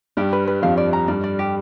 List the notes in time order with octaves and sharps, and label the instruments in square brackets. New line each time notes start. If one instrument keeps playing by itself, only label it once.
[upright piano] G2 G3 [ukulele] G4
[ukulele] B4
B4
[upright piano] F2 F3 [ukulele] F5
[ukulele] D5
A#5
[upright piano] G2 G3 [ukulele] D5
[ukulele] D5
G4